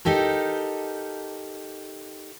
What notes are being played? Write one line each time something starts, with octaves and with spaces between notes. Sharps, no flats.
D#4 G4 A4 A#4